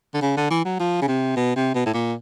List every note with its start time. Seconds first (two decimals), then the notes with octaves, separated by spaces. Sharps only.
0.14 D3
0.21 C#3
0.37 D3
0.50 E3
0.64 F#3
0.79 F3
1.02 C#3
1.08 C3
1.36 B2
1.56 C3
1.74 B2
1.86 A2
1.94 A#2